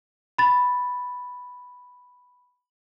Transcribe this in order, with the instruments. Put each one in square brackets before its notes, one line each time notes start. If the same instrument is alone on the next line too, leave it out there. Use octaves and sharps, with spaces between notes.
[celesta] B5 A6